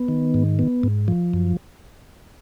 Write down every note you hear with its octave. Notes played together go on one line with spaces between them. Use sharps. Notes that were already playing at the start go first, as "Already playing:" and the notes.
Already playing: B3
D#3
G#2
B3
G#2
F3
F#2